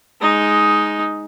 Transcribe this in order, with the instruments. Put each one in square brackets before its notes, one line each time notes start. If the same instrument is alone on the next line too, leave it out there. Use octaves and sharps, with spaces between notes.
[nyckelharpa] G#3 D#4